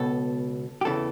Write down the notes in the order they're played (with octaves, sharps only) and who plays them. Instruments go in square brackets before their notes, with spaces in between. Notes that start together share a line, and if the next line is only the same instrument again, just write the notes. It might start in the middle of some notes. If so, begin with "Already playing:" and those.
Already playing: [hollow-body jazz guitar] C#2 B2 A4
G4
E2 C#3 E3 A4